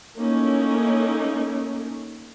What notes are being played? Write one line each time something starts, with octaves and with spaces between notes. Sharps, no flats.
A3 A#3 C#4 D#4 E4